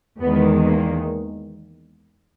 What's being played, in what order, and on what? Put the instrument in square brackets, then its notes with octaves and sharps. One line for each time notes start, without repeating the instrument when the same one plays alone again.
[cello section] E2 D#3 G#3 B3
A#3